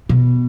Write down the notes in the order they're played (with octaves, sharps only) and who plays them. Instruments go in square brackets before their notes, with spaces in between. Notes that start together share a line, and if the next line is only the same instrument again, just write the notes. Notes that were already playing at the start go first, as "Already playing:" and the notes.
[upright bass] B2